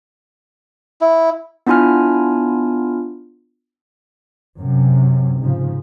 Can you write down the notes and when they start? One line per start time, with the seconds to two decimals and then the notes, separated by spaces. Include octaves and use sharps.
1.01 E4
1.67 B3 D4 E4 F4 G#5 F6
4.58 F#2 C3
5.40 G#2 C#3 F3